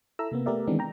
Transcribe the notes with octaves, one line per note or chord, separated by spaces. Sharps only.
E4 A4 E5 A#5 E6
C3 A#3 B3
A3 B3 G4 A#4 D5 E5
D#3 E3 G#3 B3 C4 D4
G5 A#5